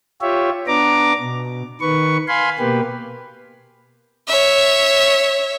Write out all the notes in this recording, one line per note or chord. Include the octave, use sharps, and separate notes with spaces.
F4 G4 C#5 E5
B3 D4 A#5 D6
B2
D#3 B4 C#6
F5 G#5 B5 C6
B2 A#3 G4 B4
C#5 E5